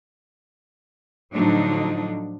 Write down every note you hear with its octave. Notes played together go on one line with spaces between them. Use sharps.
A2 D3 F3 F#3 D4 D#4